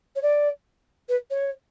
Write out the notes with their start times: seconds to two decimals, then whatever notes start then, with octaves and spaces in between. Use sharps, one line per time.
0.15 C#5
0.22 D5
1.08 B4
1.30 C#5